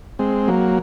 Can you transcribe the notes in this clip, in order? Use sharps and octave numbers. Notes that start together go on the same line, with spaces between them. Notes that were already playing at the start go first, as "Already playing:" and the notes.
G#3 C4
F#3 A#3